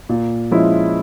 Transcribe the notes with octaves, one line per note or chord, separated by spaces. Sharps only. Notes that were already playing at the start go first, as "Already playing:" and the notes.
A#2
F3 G#3 C#4 E4